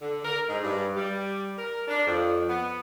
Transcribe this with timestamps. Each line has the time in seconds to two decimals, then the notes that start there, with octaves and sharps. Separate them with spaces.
0.02 D3
0.25 A#4
0.48 G#2
0.64 G2
0.97 G3
1.58 A#4
1.88 D4
2.06 F2
2.49 B3